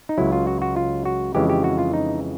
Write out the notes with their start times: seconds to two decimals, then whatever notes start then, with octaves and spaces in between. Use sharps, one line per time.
0.09 D#4
0.18 C#2 C#3 F#3 E4
0.32 F4
0.47 F#4
0.62 F#4
0.76 F4
1.05 F#4
1.35 F2 C#3 E3 G#3 G4
1.49 G4
1.64 F#4
1.79 F4
1.94 D#4